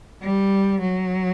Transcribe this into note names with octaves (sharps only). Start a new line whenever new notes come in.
G3
F#3